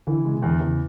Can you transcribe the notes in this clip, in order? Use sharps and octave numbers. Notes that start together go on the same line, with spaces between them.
D3 E3
C#3 G#3
B2
E2 D3
E2 C#3